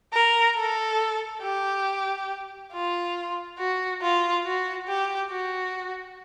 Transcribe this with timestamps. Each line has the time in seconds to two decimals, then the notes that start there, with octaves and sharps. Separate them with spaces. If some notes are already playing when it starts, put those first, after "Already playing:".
0.13 A#4
0.57 A4
1.42 G4
2.72 F4
3.58 F#4
4.02 F4
4.45 F#4
4.87 G4
5.31 F#4